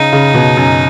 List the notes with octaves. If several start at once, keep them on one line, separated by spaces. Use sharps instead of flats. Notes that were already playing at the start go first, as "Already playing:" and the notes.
Already playing: C#3 D#4
C#3
B2
F#2